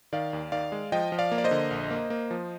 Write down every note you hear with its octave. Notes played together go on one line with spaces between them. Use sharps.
D#3 D5 F5
D#2
D#3 D5 F5
G#3
F3 D#5 G5
F3
D5 F5
A#3
D5
C5 D#5
D3
A#1
A#3
A#3
F3